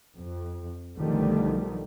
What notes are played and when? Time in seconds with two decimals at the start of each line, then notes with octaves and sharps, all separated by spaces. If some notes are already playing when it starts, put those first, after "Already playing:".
0.17 F2
0.98 B1 D3 D#3 F3 G3 A3